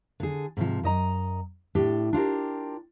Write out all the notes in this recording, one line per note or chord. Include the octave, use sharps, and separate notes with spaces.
D3 G#4
G#2 C3 F3
F#2 D#5 A#5
A2 D4 G4
D4 F4 G4 A#4